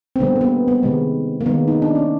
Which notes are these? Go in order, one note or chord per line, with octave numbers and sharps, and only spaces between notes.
C4
D3 G3 A#3 B3
A#3
B3
B3
C3 D#3 G#3
A#3
D#3 G#3 B3
D#4
D4
C#4